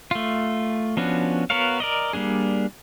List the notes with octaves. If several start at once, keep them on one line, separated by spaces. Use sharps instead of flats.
A3 F4
F3 B3 C#4 D4 F#4
B3 F#4 A#4 C#5 F5
A#4 D5 D#5
G3 A#3 D4 G#4